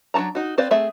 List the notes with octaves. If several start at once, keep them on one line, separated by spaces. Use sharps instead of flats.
F#3 D4 F#4 A5 A#5
D#4 F#4
C4 B4 C5 D5 F5
A3 C4 G#4 E5